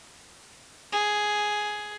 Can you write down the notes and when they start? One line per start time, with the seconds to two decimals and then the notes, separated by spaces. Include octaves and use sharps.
0.93 G#4